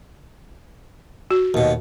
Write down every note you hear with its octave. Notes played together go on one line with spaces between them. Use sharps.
F#4
D#2 B2